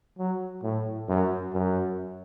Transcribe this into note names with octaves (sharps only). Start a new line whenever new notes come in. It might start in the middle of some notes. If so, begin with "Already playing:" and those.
F#3
A2
F#2
F#2